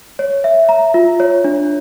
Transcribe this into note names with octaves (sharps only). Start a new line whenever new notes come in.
C#5
E5
A#5
F4
C#5
D4